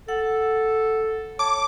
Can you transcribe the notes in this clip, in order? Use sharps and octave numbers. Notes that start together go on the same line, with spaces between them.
A4 F#5
C#5 A5 D6